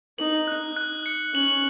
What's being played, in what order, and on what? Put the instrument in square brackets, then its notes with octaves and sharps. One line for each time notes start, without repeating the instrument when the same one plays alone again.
[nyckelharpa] D#4 [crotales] F#7
[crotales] F#6
F#6
C#7
[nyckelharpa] C#4 [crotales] F#7